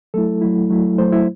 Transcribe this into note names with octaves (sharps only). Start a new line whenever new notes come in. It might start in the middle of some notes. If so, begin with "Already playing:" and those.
F#3 A3 E4 A4
F#3 A3 E4
F#3 A3 E4
F#3 A3 E4 C5
E4